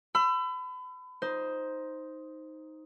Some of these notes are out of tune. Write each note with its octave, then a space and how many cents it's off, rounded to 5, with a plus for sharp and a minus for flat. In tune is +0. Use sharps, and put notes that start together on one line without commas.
B5 +35 E6 +30
D#4 +10 C5 +0